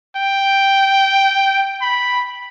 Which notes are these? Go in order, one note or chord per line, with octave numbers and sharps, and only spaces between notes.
G5
B5